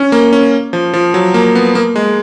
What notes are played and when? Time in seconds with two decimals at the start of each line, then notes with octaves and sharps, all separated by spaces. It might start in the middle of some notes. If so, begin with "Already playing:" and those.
Already playing: C#4
0.12 A#3
0.33 C#4
0.73 F3
0.94 F3
1.14 F#3
1.34 A#3
1.55 B3
1.75 A#3
1.96 G#3